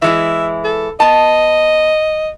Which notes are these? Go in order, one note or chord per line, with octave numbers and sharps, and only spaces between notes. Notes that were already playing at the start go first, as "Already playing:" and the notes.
E3 G#3 E4 E5
A4
B3 D#5 A5